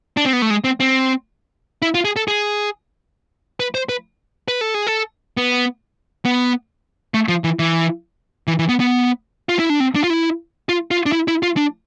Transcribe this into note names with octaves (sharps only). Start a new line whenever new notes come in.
D4
C4
B3
A3
G#3
C4
C4
E4
F4
G#4
A4
G#4
B4
C5
B4
B4
A4
G#4
A4
B3
B3
A3
F3
E3
E3
E3
E3
B3
B3
F4
E4
D4
C4
D4
F4
E4
F4
F4
D4
E4
E4
F4
D4